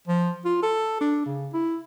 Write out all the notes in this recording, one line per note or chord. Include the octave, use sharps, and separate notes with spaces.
F3
F4
A4
D4
C#3
E4